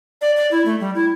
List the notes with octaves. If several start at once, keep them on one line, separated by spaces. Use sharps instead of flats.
D5
D5
E4
A3
G3
E4